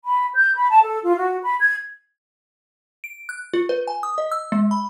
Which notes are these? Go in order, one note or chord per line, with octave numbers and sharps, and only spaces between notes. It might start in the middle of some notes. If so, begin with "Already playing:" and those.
B5
G6
B5
A5
A4
F4
F#4
B5
G#6
D7
F#6
F4
B4
G#5
D#6
D#5
E6
G#3
B5